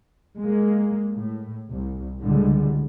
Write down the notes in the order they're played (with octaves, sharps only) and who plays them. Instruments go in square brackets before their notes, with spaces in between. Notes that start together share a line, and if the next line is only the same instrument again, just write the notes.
[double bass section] G#3 A#3
A2
C2
C#2 A2 D3 G3 G#3